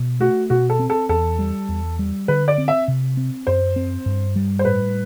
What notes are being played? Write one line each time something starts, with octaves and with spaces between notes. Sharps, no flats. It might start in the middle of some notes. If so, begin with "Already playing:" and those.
Already playing: B2
A3 F#4
B2 F#4
A4
C4
A4
E2 A4
G3
E2
G3
D3 B4
D5
C4
E5
C3
C4
F#2 C5
C4
G2
G3
C5
A2 B4